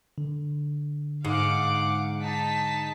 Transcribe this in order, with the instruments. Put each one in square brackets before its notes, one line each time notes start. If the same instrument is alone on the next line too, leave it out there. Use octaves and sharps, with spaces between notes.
[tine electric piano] D3
[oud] G#2 [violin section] F5 F#5 D6
[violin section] D#4 A5 B6